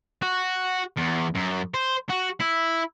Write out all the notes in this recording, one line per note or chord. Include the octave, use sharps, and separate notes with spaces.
F#4
E2
F#2
C5
F#4
E4